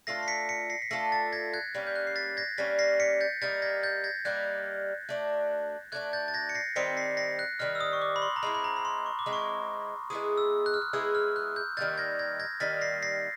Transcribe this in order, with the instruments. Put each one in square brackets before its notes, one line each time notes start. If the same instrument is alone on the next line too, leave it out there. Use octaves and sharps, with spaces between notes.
[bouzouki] A3 D4 F4 A4 [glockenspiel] A#6 C7
[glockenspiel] C7
B6 C#7
B6 C#7
A#6 C7
B6
[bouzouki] A3 D4 F4 A4 [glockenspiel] A#6 C7
[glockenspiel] A6 B6
G#6 A#6
F#6 G#6
[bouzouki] G3 A#3 C#4
[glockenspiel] G6
F#6
C7
A6 B6
G#6 A#6
[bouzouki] G3 A#3 C#4 [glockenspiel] A6 B6
[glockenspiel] A#6 C7
B6 C#7
G6 A6
[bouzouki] G3 A#3 D#4 [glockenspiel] G6 A6
[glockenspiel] G#6 A#6
G6 A6
G#6 A#6
[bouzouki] G3 A#3 D#4 [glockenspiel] F#6 G#6
[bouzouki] A3 D4 F#4
[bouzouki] A3 D4 F#4 [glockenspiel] F#6 G#6
[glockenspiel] G6 A6
A6
G#6 A#6
C#7
A#6 C7
[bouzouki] D#3 G3 C4 D#4 [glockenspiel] B6 C#7
[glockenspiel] A#6 C7
A#6 C7
F#6
[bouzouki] D#3 G3 C4 D#4 [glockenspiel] F6
[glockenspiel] E6
D#6
C#6
D6
B5
C6
A#5
[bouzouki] G#3 C4 E4 [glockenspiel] B5
[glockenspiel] B5
A#5
B5
C6
C#6
D6
[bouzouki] G#3 C4 E4
[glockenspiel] C#6
[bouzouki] G#3 B3 E4 G#4 [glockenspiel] D#6
[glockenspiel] E6
F#6
F6
F#6
[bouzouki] G#3 B3 E4 G#4 [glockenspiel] E6
[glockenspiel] F6
F#6
G6
[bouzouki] D#3 G3 A#3 D#4 [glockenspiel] G6 A6
[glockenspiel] G#6 A#6
G#6 A#6
G#6 A#6
[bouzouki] D#3 G3 A#3 D#4 [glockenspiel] A6 B6
[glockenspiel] A#6 C7
A#6 C7